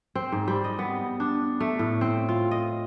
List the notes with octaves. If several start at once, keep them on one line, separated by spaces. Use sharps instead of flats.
C4
G#2
G3
D#5
B3
D4
A3
A2
C4
F4
D#5